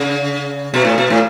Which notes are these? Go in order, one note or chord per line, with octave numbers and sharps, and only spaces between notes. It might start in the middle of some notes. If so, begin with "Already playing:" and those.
Already playing: C#3
B2
A2
B2
A2